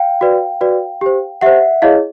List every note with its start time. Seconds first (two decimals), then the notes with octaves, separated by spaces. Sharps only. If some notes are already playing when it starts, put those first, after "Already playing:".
Already playing: F5 G5
0.21 F#4 B4 D5
0.61 F#4 B4 D5
1.01 G4 C5
1.41 G4 C5 E5 F#5
1.82 E4 G#4 C#5 D#5 F5